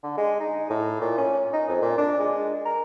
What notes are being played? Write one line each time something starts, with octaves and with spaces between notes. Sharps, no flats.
D3
G#3
D#4
A2
A#2
C#4
D#4
F2
A#2
D4
G#3
A#4